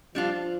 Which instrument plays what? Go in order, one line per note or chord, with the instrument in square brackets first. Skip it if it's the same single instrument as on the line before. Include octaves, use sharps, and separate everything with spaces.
[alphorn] F3 [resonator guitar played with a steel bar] G3 D4 F4